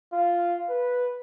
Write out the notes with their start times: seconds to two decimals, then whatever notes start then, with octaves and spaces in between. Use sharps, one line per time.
0.13 F4
0.69 B4